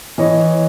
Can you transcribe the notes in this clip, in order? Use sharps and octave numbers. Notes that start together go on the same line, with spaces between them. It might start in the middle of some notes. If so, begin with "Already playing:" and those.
E3 C#5 D#5